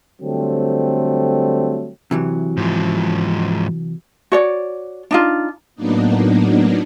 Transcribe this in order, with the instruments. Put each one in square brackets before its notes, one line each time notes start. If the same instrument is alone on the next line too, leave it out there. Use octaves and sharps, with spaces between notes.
[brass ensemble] D3 F#3 G3 A3 C4
[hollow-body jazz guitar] C3 E3 F#3
[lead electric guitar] G#2 F3
[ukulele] F#4 C#5 D5
D4 D#4 F4
[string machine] A2 F#3 A#3 B3 D4 D#4